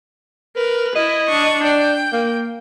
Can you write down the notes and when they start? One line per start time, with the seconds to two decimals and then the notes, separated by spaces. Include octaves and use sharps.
0.56 A#4 B4
0.95 E4 D#5
1.28 D4 C#6
1.64 D4 G5
2.13 A#3